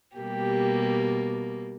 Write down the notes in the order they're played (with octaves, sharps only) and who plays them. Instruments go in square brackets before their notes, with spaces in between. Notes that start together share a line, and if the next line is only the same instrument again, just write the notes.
[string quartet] B2 G3 A#3 G4